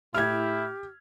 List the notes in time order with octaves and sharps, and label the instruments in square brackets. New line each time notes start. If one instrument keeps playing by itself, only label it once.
[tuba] A2 [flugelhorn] E4 [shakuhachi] G4 [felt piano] F6 G#6